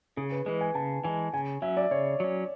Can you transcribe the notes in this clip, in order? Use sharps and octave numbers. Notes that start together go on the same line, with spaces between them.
C#3 G#4
B4
E3 G#3 B4
G#5
C#3 A5
E3 G#3 G#5
C#3 G#5
F#3 C#4 E5
D5
C#3 C#5
F#3 C#4